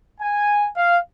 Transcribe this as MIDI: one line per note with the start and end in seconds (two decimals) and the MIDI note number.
0.21 0.68 80
0.76 0.98 77